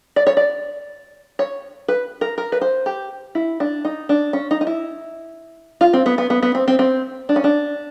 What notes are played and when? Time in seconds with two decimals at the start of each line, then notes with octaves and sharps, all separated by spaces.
0.16 D5
0.27 C#5
0.37 D5
1.39 C#5
1.88 B4
2.21 A#4
2.38 A#4
2.52 B4
2.61 C5
2.86 G4
3.35 E4
3.60 D4
3.85 D#4
4.09 D4
4.33 C#4
4.51 D#4
4.61 D#4
4.67 E4
5.81 F4
5.93 C4
6.06 B3
6.18 B3
6.30 B3
6.43 B3
6.55 C4
6.68 C4
6.79 C4
7.29 D4
7.36 C#4
7.44 D4